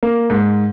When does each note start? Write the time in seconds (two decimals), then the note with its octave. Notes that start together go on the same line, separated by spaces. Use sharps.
0.03 A#3
0.30 G#2